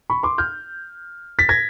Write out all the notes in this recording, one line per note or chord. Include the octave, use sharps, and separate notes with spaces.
B5 C#6
C6 D6
F6 G6
A6 B6
G#6 A#6